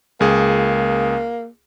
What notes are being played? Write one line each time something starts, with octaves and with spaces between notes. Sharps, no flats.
C#2 A#3 G#4